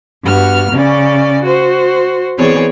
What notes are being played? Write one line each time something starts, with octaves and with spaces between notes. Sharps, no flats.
G2 B3 F#4 F6
C#3 C#4 D5
F#4 C5
E3 B3 C4 G#4 C#5 D5